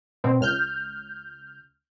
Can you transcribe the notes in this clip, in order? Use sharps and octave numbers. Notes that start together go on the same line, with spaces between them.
B2 C4
C#2 F6 G6